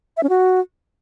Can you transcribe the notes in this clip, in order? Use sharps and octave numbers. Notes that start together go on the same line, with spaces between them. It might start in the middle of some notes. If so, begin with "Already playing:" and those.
E5
C#4
F#4